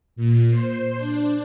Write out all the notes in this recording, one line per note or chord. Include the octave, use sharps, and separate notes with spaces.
A#2
C5
D4